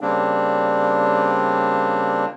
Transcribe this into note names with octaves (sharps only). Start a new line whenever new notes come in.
C#3 G3 A#3 C4 D4